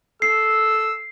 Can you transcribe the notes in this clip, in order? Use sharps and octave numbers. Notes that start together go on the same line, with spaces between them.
A4 E6 C7